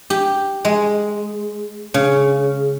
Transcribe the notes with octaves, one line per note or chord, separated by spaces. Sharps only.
G4
G#3
C#3